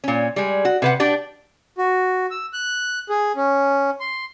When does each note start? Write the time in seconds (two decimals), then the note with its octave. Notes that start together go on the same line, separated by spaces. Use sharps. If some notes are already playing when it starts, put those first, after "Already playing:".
0.04 A#2 C#4
0.36 G3 G#3
0.65 F#4
0.82 C3 B4 F#5
1.00 D4 G4 D5
1.78 F#4
2.31 E6
2.53 F#6
3.09 G#4
3.36 C#4
4.00 C6